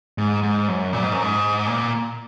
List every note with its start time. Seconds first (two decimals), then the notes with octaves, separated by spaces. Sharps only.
0.18 G#2
0.43 G#2
0.68 F#2
0.93 A#2
1.03 G#2
1.13 F#2
1.22 G#2
1.67 A#2